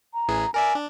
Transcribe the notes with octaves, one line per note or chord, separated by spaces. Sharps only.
A#5
A1 E3 G#4
A#4 D5 E5 G#5
D4